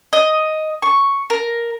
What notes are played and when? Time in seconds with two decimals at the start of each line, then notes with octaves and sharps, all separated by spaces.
0.13 D#5
0.82 C#6
1.30 A#4